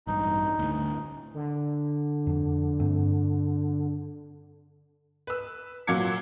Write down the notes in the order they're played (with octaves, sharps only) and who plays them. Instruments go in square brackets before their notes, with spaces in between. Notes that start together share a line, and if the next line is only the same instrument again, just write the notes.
[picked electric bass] A1 G2 [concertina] D#4
[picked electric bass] D2 A2
[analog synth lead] D3
[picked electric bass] F2 F3 D4
G2 A3 C4
[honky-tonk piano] B4 E6
A#2 F#3 F5 D6 G#6 C#7